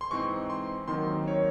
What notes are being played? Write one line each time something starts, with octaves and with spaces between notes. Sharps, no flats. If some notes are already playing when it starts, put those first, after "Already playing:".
C6
G#2 E3 C4 D#4 C#6
C6
D#2 D#3 F#3 C4 D#4 C6
C#5